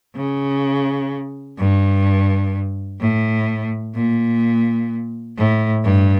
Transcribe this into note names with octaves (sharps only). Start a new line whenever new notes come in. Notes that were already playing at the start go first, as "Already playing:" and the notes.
C#3
G2
A2
A#2
A2
G2